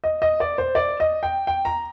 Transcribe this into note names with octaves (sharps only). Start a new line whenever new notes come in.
D#5
D#5
D5
C5
D5
D#5
G5
G5
A#5